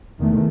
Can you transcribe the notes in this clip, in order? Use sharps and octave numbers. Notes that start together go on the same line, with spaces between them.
E2 D#3 A3